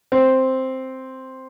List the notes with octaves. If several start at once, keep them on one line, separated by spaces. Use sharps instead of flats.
C4